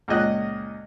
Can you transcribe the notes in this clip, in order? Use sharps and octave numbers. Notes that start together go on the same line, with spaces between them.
C#2 A#2 D#5 F#6